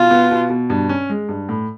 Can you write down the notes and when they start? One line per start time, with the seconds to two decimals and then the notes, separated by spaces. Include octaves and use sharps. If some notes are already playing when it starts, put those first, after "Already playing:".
Already playing: B2 F4
0.11 B3
0.31 B2
0.50 B2
0.70 G2
0.89 C#4
1.10 G#3
1.29 G2
1.49 A2